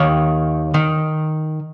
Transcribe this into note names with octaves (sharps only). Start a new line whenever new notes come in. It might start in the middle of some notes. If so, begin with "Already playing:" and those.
Already playing: D#2 D#3 C#5
D#3